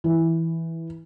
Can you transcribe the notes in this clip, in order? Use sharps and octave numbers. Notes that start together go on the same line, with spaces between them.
E3